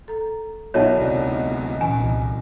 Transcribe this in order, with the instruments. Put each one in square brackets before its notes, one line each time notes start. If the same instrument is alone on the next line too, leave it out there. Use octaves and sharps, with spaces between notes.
[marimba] A4 A#5
[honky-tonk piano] B1 E4 F#4 [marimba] A#4 E5 [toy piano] C#5 A5
[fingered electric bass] D2 C3 [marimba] A#4 D5 D#5
[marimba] A#2 C#4 [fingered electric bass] E3 [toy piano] G#5
[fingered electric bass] C2